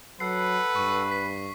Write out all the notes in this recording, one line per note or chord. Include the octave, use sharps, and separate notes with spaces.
F#3 A4 B4 F#5 C7
G2 C#6
B6